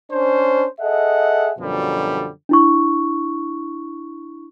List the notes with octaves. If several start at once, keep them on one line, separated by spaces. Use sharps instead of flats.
C#4 D4 C5
G#4 A4 D#5 E5 F#5
F#2 B2 D3 F3 G3
D4 E4 C#6